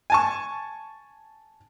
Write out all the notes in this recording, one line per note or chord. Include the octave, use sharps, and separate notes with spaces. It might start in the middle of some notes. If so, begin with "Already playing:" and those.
G#5 A5 C#6